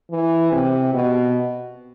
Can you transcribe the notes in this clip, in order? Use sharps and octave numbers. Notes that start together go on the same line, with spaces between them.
E3
C3
B2